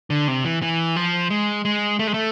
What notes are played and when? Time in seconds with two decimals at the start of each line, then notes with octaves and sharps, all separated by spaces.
0.10 D3
0.28 C3
0.45 E3
0.62 E3
0.96 F3
1.30 G#3
1.65 G#3
1.99 A3
2.07 G#3
2.14 A3